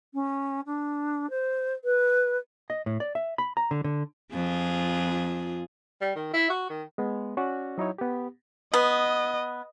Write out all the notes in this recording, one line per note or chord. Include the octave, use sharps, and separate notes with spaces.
C#4
D4
C5
B4
D#5
A2
D5
E5
B5
A#5
D3
D3
F2 F4 G#4
G3
D#3
E4
F#4
D#3
G#3 B3
C#4 F#4 D5
F#3 D#4 E4 C#5
B3 G4
B3 D#5